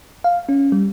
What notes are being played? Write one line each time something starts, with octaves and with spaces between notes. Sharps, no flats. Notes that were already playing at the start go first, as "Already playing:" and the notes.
F5
C#4
G3